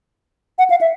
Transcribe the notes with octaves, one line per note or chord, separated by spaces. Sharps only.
F#5
F5
E5